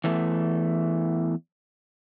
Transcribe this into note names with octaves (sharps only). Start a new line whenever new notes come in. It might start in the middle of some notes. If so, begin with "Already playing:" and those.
E2 E3 A3